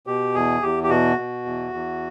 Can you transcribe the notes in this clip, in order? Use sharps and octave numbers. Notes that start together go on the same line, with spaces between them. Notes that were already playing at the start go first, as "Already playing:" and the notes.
B2 G4
E2 G#4
E2 G4
G4
B2 F#4
B2
E2
E2